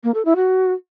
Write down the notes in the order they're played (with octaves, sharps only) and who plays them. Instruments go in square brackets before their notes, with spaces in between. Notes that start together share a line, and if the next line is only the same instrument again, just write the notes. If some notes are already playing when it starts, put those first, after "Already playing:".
[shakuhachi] A#3
A4
E4
F#4